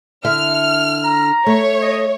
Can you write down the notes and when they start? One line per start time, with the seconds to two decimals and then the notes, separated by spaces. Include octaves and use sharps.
0.24 D3 E4 E5 F6
1.04 A#5
1.46 A3 C#5
1.81 D#5